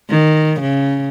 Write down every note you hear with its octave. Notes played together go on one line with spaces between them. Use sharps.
D#3
C#3